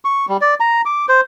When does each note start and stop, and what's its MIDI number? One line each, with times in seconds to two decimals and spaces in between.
0.05 0.26 85
0.29 0.37 55
0.41 0.54 74
0.60 0.81 82
0.86 1.06 86
1.09 1.21 72